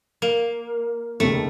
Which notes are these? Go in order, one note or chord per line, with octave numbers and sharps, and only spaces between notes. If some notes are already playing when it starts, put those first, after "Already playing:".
A#3
F1 D#2 C#3 A3